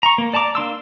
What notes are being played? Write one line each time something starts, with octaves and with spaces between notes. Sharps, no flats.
A#5 C#6
A#3
D5 A5 A#5 D6
A#3 D4 C6 E6